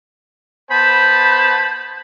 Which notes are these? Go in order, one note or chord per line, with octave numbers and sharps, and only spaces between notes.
B3 C5 A5 B5 G6